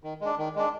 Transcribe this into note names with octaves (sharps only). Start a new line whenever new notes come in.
D#3
G#3 D4
D#3
G#3 D4